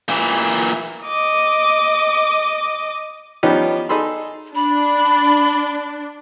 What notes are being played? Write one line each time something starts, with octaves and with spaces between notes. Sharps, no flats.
A#2 E3
D#5 D6
F3 G3 B3 C#4 D#4 G4
D#4 G#4 A4 B5 C6
D4 B5